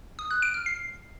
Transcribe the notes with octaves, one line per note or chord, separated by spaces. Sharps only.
D#6
F#6
D7
F6
C7